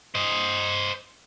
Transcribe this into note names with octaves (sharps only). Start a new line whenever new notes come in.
C5 D#5